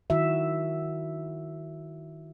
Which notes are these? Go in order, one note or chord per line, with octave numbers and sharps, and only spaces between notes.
D#3 E4 F#4 E5